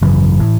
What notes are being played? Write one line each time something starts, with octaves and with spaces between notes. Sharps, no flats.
G#1 F#2 C#3 E3
A2